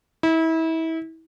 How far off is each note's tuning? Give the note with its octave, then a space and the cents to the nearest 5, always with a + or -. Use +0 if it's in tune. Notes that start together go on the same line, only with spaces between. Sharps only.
E4 -30